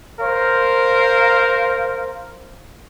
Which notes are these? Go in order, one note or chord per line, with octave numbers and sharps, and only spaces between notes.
A#4 C5 F5